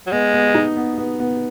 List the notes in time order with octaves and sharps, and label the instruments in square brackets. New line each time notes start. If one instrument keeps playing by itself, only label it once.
[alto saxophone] F#3
[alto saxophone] G#3 [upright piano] B3
[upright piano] B3
D#4
B3
B3
B3